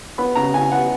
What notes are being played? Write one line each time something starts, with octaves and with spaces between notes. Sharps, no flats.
B3 B5
C#3 A#5
C#3 G#5
B3 F#5